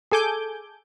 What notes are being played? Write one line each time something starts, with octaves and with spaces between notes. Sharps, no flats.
G#4 A4 G#5 D6 G6